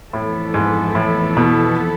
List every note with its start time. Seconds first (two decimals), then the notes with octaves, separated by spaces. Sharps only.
0.13 F2 A2 E3 B3 E4 A4
0.54 G#2
0.95 A2
1.37 B2